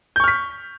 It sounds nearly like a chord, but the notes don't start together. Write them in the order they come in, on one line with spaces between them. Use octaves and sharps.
G6 C#6 F6 B6